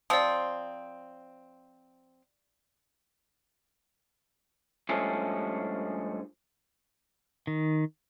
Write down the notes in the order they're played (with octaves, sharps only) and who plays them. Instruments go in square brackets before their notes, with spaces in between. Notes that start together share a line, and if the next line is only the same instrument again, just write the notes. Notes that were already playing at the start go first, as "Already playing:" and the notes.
[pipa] F3 C4 [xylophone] D5 D#6
[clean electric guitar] G2 F3 G#3 A3 C#4
[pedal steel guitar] D#3